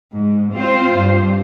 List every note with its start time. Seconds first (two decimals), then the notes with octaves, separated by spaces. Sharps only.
0.14 G#2
0.53 C4 F4 C5
0.97 G2